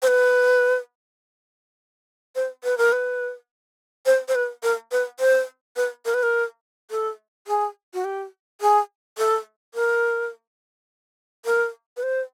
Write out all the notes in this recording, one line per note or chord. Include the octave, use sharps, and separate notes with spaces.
C5
B4
C5
B4
A#4
B4
C5
C5
B4
A#4
B4
C5
B4
A#4
B4
A#4
A4
G#4
F#4
G4
G#4
A4
A#4
A#4
B4
C5